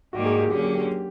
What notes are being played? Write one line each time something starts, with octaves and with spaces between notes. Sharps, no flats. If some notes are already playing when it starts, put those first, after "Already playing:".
G#2 D#3 G3 A#3 F#4
G#4
G4
D3 F#3 A#3 C#4 G4
G4
G4